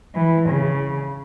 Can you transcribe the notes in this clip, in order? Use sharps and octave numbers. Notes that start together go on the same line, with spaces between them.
E3
C#3